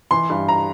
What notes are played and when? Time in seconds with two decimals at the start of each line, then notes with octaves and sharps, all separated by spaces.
0.11 E3 C6
0.30 G2
0.49 A#5